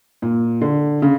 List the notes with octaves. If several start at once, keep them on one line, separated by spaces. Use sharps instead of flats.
A#2
D3
C#3